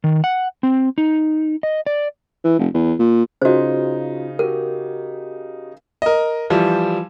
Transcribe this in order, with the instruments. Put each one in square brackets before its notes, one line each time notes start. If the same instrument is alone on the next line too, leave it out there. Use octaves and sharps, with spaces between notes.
[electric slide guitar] D#3
F#5
C4
D#4
D#5
D5
[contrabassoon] E3
F1
E2
A#2
[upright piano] C#3 D#4 [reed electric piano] C#4 F4 [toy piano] F#4 C5
[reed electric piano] F#4 G4 [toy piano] A#4
[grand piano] A#4 D#5
E3 F3 G3